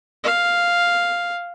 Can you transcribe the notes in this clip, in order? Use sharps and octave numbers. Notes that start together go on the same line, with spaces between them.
F5